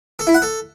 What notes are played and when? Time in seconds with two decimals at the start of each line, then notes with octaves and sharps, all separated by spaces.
0.19 A4
0.27 E4
0.34 F#5
0.42 A4